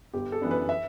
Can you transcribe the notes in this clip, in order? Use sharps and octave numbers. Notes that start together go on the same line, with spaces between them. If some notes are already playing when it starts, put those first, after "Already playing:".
G1 G4
A4
F#2 E3 B3 D4
B4
E5